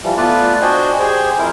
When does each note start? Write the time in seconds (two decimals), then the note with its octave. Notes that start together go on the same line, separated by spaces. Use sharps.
0.04 E3 F3 G3
0.17 A3 B3 F4 B4 D5 A5
0.62 D4 F#4 C5 D#5 G5 G#5
0.99 G4 G#4 C5 G5 G#5
1.39 F2 E4 A#4 C5